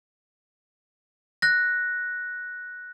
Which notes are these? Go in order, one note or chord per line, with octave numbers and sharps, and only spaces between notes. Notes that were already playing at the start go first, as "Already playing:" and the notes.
F#6 A#6